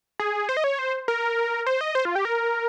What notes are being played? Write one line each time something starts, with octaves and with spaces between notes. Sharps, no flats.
G#4
C5
D#5
C#5
C5
A#4
C5
D#5
C5
F4
G4
A#4